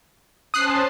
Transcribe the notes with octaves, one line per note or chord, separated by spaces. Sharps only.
C#4 C5 A5 D#6 F#6 C7